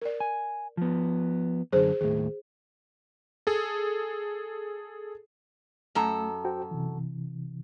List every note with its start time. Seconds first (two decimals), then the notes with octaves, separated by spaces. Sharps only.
0.02 A#4 D5
0.20 G#5
0.77 F3 B3
1.73 F#2 D3 G#4 C5
2.01 D#2 A2 G#4
3.47 G#4 A4
5.95 F#2 A3 A4 A#5
6.45 F#4 C5 G5
6.71 C3 E3